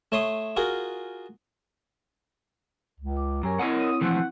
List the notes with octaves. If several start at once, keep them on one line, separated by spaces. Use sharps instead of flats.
A3 C#5 C6 D#6
F4 F#4 G#4 A#4
C#2
D6
F#2 C#4 G4 A#4 C#5 G#5 A#5
C4 E4 A#4 C#5 D#5 F#5
C#5 D#6
E3 F3 A3 F#5